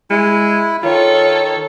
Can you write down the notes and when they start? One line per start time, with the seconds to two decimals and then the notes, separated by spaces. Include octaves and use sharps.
0.11 G#3 E4
0.83 D#3 F4 A4 C#5